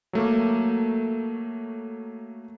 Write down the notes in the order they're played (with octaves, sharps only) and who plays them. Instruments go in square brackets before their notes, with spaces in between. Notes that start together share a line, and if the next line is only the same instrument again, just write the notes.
[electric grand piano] F#3 A3 A#3